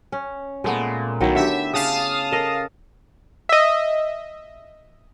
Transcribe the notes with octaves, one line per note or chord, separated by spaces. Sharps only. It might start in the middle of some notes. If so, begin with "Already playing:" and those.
C#4
A#2 G#3 A3 B3
B1 D#3 F#3 E4
D3 G4 E5
C#3 F5 A5 D#6
A4 A#4 D#5
D#5 E5